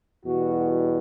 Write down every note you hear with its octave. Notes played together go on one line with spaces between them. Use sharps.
E2 B2 G3 F#4